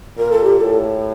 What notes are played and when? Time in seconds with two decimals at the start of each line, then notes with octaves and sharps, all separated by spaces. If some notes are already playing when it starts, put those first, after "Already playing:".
0.17 A#2 A#4
0.31 A4
0.44 G4
0.58 A2 A4